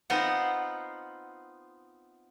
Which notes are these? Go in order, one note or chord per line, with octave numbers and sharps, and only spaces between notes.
B3 C4 D#4 F4 C5 F#5